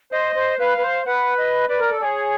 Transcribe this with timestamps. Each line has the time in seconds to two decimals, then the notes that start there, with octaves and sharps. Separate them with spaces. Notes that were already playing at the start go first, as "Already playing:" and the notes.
0.12 C5 D#5
0.36 C5
0.59 B4 F5
0.78 B4
0.83 C5
1.06 B4 F#5
1.38 D#5
1.69 B4 D5
1.80 A#4
1.91 A4
2.00 G#4 C#5 D5